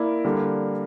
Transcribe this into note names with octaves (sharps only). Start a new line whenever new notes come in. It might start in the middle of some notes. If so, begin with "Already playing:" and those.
Already playing: A#3 E4 A#4 D5
D3 G3 A#3